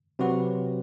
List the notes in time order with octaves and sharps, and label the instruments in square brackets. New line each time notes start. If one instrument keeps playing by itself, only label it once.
[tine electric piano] C3 F#3 C4 F#4 B4